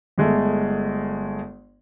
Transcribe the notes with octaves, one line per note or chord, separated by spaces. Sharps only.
G1 G#3 A3